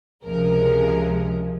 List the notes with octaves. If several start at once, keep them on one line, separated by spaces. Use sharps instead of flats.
C#2 C3 F3 G#3 A#4